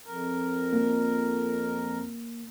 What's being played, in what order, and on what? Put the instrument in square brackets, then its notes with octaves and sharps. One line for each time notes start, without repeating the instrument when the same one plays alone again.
[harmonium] F2 A#4
[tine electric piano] A#3